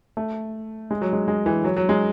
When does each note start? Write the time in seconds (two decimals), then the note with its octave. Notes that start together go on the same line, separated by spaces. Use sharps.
0.17 A3
0.91 G#3
1.02 F#3
1.13 G#3
1.28 G#3
1.46 E3
1.65 F#3
1.77 F#3
1.89 G#3